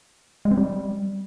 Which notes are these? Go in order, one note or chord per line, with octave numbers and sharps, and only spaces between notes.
G#3
C4
G3